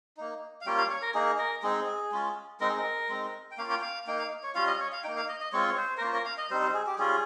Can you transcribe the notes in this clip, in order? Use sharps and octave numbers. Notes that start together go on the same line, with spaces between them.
A#3 D#4
F5
G3 A#3 C#4 F4 G5
F5
C#5
A#4
A#3 D#4 G#4
A#4
G#3 C4 D#4 G#4
G#3 C#4 F4
G#3 C4 D#4 A#4
G#4
A#4
G#3 C4 D#4
G5
A#3 C#4 F4 F5
G5
F5
A#3 D#4 G5
F5
C#5
G3 C#4 F4 F5
D#5
C#5
F5
A#3 D#4 G5
F5
D#5
D#5
G#3 C4 F4 C#5
C#5
C5
A#4
A#3 C#4 F4 C5
A#4
F5
D#5
G3 C4 D#4 C5
C5
G#4
G4
G3 C#4 F4 G#4